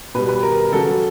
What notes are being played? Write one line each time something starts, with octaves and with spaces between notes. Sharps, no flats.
B2 G3 B4
B4
A#4
C#3 F#3 A4